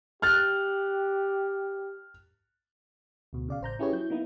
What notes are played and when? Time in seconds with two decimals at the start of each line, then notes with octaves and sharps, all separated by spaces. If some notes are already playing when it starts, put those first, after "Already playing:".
0.22 G4 F6 F#6 A6
3.33 D2 B2
3.48 C#3 D5 F5
3.61 A1 C5 A#5 G6
3.79 C#4 E4 G4 G#4 B4 C#5
3.93 F#3 E4 G6
4.10 A#3 B3 D#4 E4